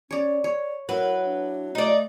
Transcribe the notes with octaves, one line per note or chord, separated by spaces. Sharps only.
C#4 C#5 D5
C#5 D5
F#3 E4 A#4 B4
D4
A3 D#4 D5